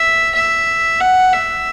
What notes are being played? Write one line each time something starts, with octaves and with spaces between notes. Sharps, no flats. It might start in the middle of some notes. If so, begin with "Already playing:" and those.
Already playing: E5
E5
F#5
E5